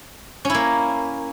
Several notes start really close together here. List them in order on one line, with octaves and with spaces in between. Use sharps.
C#4 E4 A#3